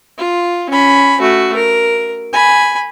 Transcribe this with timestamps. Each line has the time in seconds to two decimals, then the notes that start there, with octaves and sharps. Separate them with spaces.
0.18 F4
0.70 C#4 B5
1.21 A3 F#4
1.56 A#4
2.33 G#5 B5